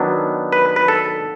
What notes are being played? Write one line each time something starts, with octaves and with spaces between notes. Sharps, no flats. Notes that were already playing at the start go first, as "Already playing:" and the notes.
Already playing: D#3 F#3 B3 D4
B4
B4
A4